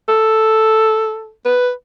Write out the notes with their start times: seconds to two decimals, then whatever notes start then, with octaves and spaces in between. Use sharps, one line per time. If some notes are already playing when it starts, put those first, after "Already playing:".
0.09 A4
1.45 B4